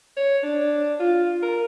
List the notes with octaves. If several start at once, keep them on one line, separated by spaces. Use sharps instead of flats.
C#5
D4
F4
A#4